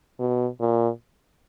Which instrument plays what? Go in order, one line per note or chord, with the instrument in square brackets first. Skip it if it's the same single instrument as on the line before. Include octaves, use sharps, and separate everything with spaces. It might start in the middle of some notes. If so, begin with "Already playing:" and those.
[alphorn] B2
A#2